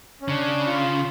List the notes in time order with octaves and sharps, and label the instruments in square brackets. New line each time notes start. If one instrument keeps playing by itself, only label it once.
[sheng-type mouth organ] C#4
[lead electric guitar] C#3 [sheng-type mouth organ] D4
[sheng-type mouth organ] F4